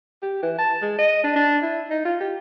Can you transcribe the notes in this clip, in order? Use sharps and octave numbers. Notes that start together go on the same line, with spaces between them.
G4
E3
A5
G#3
D#5
D4
D4
E4
D#4
F4
G4